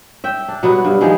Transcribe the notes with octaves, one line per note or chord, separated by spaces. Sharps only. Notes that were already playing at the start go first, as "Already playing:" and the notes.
E5 G5
D4
B2 F#3 G3 B3
G2
D#3 F3 G#3 G#4